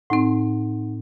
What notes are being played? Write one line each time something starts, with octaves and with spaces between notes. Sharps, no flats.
A2 C4 D#4 F#5